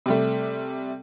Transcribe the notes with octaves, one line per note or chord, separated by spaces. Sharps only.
C3 G3 A3